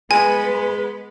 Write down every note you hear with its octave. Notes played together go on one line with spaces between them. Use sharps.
G#3 B3 B4 G#5